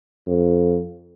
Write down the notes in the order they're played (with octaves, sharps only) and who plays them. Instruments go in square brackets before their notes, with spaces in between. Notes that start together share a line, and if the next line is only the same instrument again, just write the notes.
[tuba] F2